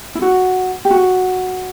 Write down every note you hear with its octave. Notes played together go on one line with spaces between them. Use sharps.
E4
F#4
G4
F#4